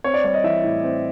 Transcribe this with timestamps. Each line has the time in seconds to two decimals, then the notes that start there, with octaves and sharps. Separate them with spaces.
0.04 C4 C#5
0.14 D5
0.24 G3 C#5
0.34 D#5
0.44 E3 E5
0.64 A2
0.83 C4